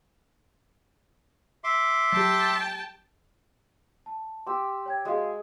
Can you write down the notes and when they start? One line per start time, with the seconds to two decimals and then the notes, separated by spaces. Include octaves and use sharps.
1.64 E5 C6 D6
2.12 F#3 G4 G5 A5
4.06 A5
4.47 G4 C6 E6
4.86 C#5 G5 G#6
5.05 G#3 F#4 G#4 D#5 F5